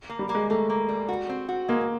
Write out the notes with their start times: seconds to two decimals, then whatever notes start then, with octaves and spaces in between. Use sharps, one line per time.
0.09 A#3
0.19 G3
0.29 A#3
0.35 G#3
0.50 A3 A#3
0.69 A#3
0.89 G3
1.08 F#4
1.29 C4
1.49 F#4
1.68 G#3 A#3